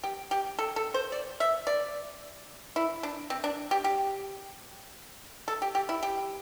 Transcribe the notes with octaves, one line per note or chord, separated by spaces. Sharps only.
G4
G4
A4
A4
C5
D5
E5
D5
E4
D4
C4
D4
G4
G4
A4
G4
G4
E4
G4